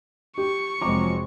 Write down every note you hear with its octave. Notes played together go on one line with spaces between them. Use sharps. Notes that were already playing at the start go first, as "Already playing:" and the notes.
G4 C#6
F1 F3 F#3 G#3 C4 A#5 D6